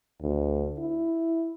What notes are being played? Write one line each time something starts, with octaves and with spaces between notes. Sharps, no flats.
D2
E4